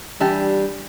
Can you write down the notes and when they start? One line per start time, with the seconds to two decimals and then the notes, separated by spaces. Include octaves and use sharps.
0.20 E3 G3 D4 G4